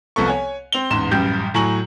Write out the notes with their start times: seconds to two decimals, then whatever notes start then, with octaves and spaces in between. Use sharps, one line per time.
0.16 C2 F3 B3 A4 C#6
0.28 C#5 G#5
0.72 C4 F7 G7
0.90 A1 E2 G#2 C6 E7
1.11 A1 F#2 G3 G4 G6
1.54 A2 F#3 G#5 A#5 C#6 F#7